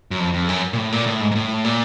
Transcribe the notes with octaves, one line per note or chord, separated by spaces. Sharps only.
F#2
F2
F2
F#2
A#2
A2
A#2
A2
G#2
G#2
A2
A#2